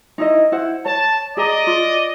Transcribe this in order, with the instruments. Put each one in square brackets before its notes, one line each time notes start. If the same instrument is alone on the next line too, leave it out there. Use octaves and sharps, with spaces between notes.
[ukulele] D#4 E4 D#5
E4 C5 F#5
[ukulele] C#5 [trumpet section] A5
[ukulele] G#4 A#5 [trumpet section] D5 D#5
[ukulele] F4